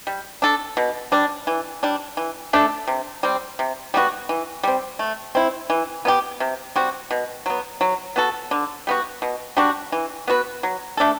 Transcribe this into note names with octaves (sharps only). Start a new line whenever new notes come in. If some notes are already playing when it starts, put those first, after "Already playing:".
G3
D4 A4
B2
G3 D4
E3
G3 D4
E3
A3 D4 A4
C3
G3 C4
C3
G3 B3 F#4
E3
G3 C4
A3
C4 E4
E3
B3 E4 G4
C3
G3 C4 F#4
B2
F#3 B3
F#3
B3 F#4 A4
D3
G3 B3 F#4
B2
G3 D4 F#4
E3
B3 F#4 B4
F#3
A3 D4 A4